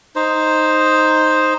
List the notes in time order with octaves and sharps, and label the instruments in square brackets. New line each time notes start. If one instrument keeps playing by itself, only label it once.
[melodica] D#4 C5